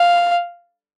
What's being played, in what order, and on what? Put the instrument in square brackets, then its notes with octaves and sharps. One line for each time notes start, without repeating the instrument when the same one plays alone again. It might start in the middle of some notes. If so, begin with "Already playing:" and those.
Already playing: [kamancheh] F5